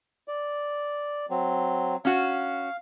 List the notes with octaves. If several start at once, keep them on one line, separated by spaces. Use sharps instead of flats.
D5
F#3 C4
C#4 F#4 F5